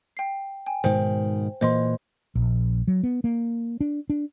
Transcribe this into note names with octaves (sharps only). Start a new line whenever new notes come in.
G5 C7
G5 G#5
G#2 B2 D#3 C5 G5
A#2 E3 A#3 C5 D#5 C6
A#1
F#3
B3
A#3
D4
D4